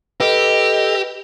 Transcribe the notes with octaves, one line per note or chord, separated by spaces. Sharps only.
G4 A4 B4 D#5